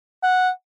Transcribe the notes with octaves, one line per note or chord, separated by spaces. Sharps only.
F#5